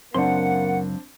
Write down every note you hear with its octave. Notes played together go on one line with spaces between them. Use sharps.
C#2 F#2 A#3 C4 D4 F#5 C6